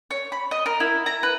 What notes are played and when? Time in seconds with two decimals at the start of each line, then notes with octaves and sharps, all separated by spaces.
0.11 C#5
0.32 B5
0.51 D#5
0.66 A#4
0.80 E4
1.06 A#5
1.23 B4